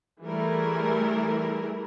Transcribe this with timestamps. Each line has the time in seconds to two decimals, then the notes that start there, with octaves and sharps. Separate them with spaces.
0.23 E3 G3 A3 E4 G#4 A#4